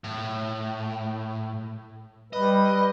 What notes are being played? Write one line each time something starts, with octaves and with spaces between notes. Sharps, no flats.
A2
G3 B4 D#5